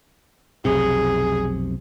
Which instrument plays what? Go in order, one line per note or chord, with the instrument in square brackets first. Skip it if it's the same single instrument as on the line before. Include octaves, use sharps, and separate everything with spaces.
[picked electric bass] F1 B1 C3 [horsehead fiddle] G#4